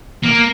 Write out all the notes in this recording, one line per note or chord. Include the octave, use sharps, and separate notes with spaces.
A#3